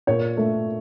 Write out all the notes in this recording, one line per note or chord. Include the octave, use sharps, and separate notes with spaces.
A#2 C#5
A3